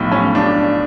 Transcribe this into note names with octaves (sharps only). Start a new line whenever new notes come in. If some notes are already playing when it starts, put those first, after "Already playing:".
Already playing: B1 A2 F3
C#4
D4